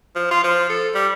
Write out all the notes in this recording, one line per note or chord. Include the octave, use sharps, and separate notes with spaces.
F3
F4
F3
A4
G3